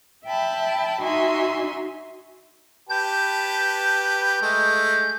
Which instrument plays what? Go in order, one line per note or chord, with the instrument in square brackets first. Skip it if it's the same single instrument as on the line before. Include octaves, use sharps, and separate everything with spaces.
[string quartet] E5 G5 A5 B5
D#4 F#4 E5 G#5 C6
[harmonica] G4 B4 A5 [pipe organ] G6
[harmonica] G#3 A3